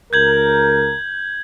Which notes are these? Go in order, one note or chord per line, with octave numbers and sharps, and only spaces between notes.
C#2 A#4 G6 G#6 F#7